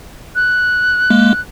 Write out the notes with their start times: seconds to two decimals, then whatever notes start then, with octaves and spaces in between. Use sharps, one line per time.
0.35 F#6
1.10 G#3 A#3